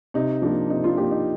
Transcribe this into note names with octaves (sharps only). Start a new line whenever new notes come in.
C3 D#4
F3 A#3 D4
C3 D#4
D4 F4
F3 A#3 D#4 G4
D#4